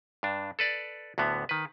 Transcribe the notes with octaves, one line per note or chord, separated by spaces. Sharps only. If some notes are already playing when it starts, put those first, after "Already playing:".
G2 D4
A4 B4 D5
D2 A2 D3 B3
D#3 B4